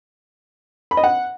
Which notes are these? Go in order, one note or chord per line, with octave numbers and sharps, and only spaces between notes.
B5
D#5
F#5